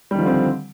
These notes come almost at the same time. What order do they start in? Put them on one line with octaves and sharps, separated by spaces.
G3 D#3 F3 D3 C4